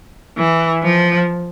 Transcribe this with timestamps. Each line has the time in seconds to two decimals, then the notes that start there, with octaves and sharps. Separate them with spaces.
0.37 E3
0.83 F3